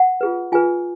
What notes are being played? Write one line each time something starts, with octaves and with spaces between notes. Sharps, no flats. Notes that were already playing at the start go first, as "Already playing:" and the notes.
Already playing: F#5
F4 G#4 B4
F4 G#4 B4 G#5